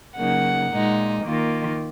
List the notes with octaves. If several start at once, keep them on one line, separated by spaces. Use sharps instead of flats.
C#3 F#3 A#3 D#4 F#5
A#2 G#3 D#4
D#3 A#3 F4